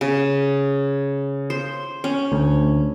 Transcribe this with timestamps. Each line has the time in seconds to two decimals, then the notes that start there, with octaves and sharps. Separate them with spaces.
0.01 C#3
1.50 C5
2.04 C#4
2.32 D2